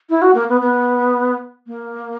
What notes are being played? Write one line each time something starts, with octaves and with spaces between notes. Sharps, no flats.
E4
F#4
A#3
B3
B3
A#3